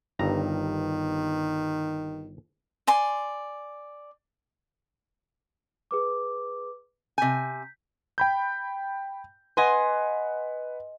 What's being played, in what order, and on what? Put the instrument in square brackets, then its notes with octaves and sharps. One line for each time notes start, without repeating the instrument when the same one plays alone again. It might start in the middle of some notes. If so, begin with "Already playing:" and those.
[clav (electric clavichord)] G1 G2 A#5 [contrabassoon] D#3
[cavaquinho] D5 G#5 C6
[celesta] G#4 B4 D6
[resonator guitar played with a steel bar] C3 G#5 [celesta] G6 B6
[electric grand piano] G5 B5 G6
[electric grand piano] B4 F#5 [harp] D#5 G#5 C6